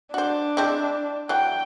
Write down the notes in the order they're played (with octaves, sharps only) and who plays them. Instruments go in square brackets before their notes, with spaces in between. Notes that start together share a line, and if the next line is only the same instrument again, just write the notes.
[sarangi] D4 [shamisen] F#4 C5
[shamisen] G#3 C4 E4
[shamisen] E3 F#3 [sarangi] G5